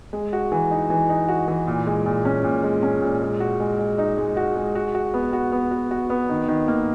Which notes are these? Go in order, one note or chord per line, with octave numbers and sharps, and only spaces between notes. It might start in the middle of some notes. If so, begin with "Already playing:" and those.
G#3
F#4
E3
D#4
E3
D#4
F#4
E3
A#2
G#3
A#2
C#4
A#2
G#3
C#4
A#2
G#3
F#4
G#3
G#3
D#4
G#3
F#4
G#3
F#4
F#4
B3
F#4
B3
F#4
F#4
B3
D#3
D#3
A#3